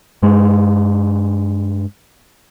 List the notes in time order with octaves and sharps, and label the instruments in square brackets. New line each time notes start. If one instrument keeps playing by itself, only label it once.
[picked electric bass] G2 G#3